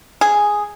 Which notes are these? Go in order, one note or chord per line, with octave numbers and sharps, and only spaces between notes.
G#4